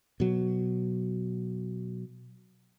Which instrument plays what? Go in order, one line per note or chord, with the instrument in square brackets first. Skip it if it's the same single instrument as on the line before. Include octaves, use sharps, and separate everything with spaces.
[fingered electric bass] B2 F#3